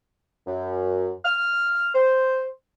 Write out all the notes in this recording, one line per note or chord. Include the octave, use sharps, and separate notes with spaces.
F#2
F6
C5